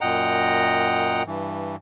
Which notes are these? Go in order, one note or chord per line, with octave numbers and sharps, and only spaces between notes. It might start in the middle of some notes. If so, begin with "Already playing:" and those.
F#2 A#2 D#5 F#5 G5 A#5
G2 E3